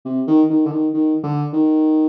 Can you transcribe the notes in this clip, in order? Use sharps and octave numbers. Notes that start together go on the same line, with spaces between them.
C3
D#3
D#3
D3
D#3
D#3
D3
D#3